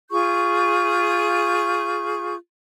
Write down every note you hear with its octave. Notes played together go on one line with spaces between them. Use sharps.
F4 G#4 C#6 G6